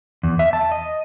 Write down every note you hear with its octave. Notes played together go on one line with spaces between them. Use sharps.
E2
E5
A5
D#5